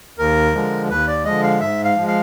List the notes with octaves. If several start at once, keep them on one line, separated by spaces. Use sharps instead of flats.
D#2 A#4
D3 F3 G#3
D#2 B4
D5
D3 F3 G#3 D#5
F5
G#2 E5
F5
F3 G#3
F5